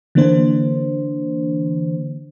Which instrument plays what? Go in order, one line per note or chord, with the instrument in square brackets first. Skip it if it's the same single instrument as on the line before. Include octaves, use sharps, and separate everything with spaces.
[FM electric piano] D3 E3 A#3 D4 C5